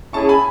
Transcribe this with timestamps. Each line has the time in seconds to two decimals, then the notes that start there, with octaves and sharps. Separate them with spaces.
0.13 C#4 E4 G#4 A5 C#6
0.29 G#5 B5